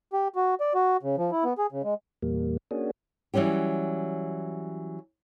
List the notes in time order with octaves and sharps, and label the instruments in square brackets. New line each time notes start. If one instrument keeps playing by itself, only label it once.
[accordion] G4
F#4
D5
F#4
C#3
F3
E4
B3
G#4
C#3
G#3
[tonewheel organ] E2 A#2 G3 A#3
A#3 C#4 D4 F#4 G#4
[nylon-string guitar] E3 F#3 G3 C#4 G4